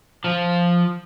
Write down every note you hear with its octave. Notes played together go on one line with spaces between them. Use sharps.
F3